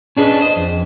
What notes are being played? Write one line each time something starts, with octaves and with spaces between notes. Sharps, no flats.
C#4 D4 G#4 B4 D#5
C5 D#5
F2